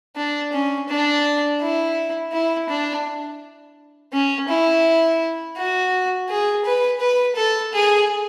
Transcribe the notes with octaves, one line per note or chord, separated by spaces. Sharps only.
D4
C#4
D4
E4
E4
D4
C#4
E4
F#4
G#4
B4
B4
A4
G#4